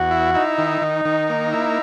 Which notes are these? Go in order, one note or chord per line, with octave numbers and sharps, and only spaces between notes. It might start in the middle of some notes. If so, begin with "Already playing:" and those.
Already playing: E2 F#4
E4
D#4 E4
D#3
D#3
D#3
A#3
E4